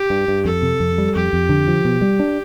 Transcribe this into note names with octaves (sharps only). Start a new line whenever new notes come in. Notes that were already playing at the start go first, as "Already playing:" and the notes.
Already playing: G4
G2
G2
F2 A4
C3
F2
G3
F2 G4
F2
D3
F3
B2
G3
D4